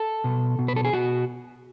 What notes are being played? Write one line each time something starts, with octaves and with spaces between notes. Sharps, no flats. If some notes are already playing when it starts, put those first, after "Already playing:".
Already playing: A4
B2
B2
B4
A4
G#4
B2 F#4